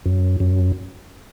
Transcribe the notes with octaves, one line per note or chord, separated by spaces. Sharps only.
F#2
F#2